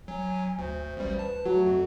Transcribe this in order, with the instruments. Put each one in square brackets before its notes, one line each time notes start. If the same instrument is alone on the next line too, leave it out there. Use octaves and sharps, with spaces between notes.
[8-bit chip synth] F#3 [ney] G#5
[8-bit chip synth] D2 [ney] C5
[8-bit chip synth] A1 D2 G3
[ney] B4 [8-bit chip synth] A5
[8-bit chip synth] F#3 [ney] A3 [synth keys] F#4
[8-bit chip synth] F2